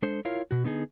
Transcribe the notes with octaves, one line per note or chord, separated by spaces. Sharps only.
G#3 D4 A4 C5
E4 F4 A#4 C#5 F5
B2 F#4
D3 B3 D#4 G#4